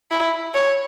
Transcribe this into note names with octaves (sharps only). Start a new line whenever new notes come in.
E4
C#5